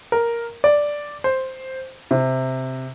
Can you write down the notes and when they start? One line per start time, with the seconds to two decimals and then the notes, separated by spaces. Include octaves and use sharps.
0.12 A#4
0.64 D5
1.24 C5
2.11 C3